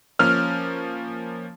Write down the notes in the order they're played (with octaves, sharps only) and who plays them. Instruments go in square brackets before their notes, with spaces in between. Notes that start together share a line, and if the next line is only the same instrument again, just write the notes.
[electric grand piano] F3 A#3 C#4 [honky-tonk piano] F6